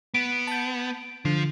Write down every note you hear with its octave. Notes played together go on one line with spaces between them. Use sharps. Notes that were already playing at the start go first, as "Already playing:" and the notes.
B3 D7
A5 G6
D3 F3